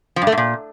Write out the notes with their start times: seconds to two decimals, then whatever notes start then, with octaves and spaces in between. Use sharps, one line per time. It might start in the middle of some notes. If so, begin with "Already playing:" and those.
0.16 F3
0.22 G2
0.27 A3
0.32 G#2
0.37 A#2